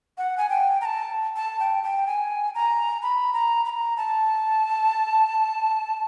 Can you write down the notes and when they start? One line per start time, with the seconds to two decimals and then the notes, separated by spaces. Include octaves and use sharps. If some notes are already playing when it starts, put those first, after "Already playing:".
0.18 F#5
0.38 G#5
0.50 G5
0.81 A#5
0.85 A5
1.36 A5
1.60 G5
1.83 G5
2.07 G#5
2.55 A#5
3.02 B5
3.33 A#5
3.66 B5
3.69 A#5
3.97 A5